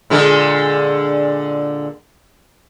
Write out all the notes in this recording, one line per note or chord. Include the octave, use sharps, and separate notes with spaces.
A#2 D3 G#3